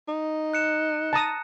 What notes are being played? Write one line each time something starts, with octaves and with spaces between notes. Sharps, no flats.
D#4
F#6 C#7 E7
A5 A#5 D#6